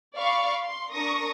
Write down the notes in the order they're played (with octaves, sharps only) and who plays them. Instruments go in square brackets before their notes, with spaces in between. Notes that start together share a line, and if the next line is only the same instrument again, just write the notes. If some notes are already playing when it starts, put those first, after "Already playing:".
[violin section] D5 F5 B5 C#6
C6
D4 A#4 C#6 D#6 A#6